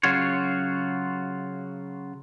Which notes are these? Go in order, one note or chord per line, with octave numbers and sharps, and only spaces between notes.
C#3 F#3 F4 F#4 C#5